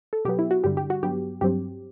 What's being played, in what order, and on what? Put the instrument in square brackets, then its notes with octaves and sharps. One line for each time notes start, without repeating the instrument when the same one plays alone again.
[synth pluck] A4
B2 F#3 B3 G4
E4
F#4
G2 D3 G3 G4
G4
F#4
G2 F#3 B3 G4
G2 F#3 C4 G4